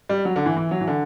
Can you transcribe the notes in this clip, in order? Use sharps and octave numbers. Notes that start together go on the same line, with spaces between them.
G3
F#3
D3
E3
E3
F#3
E3
D3